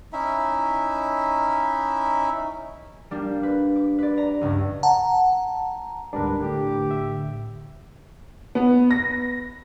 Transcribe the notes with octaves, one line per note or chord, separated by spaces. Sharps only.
C#4 D#4 E4 E5
G3 A#3 D4 G4
B4
D6
B4 D5
A#5
C#2 G2
F#5 A5 A#5
D2 G#2 G3 D4 A#4 B4
A2 D3 G4
E5
B3
A#6